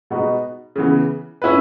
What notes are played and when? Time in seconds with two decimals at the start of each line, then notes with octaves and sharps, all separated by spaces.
0.10 B2 G#3 B3 D#4 F#4
0.76 C#3 E3 B3
1.42 C#4 E4 B4